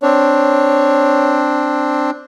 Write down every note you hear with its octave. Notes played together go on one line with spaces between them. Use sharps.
C4 D4 C#5